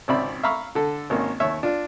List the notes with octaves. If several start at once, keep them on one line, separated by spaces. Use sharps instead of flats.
G#1 C#2 C4 D5 E5 B5
E5 F5 A#5 B5 C#6 E6
D3 A4
G#1 A#3 C#4
D#2 C#5 E5
D4 F4